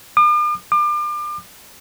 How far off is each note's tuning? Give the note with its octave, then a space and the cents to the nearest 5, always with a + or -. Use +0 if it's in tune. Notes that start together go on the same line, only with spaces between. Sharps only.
D6 +45
D6 +35